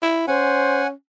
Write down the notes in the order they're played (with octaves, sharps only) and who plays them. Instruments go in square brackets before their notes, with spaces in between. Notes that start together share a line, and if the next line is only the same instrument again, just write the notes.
[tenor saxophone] E4
[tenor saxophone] C#4 [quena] C5 [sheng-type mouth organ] F#5 G#5